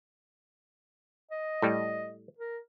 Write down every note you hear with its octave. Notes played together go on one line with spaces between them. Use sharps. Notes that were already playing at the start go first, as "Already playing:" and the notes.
D#5
A2 G3
A#4